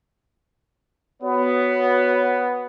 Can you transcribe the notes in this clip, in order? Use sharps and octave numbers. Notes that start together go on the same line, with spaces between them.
B3 F#4 C#5